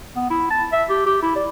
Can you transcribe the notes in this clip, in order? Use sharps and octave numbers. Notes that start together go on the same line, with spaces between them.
B3
E4
A5
E5
G4
G4
E4
D5